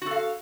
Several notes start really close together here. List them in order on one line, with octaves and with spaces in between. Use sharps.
F#4 A4 F5